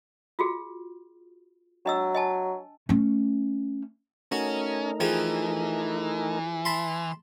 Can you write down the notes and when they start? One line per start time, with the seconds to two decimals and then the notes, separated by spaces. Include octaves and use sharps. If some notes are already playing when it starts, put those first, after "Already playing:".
0.39 F4 F#4 G#4
1.86 F#3 D4 D#5 E6
2.15 D#5 G#5 A5
2.89 A3 C#4
4.32 A3 C#4 D#4 F#4 A#4
5.00 E3 F3 G4 G#4
6.65 A5 B5 C6